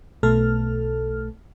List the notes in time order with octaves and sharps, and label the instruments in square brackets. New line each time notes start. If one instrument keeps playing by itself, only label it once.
[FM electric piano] B1 B2 A3 A4 F6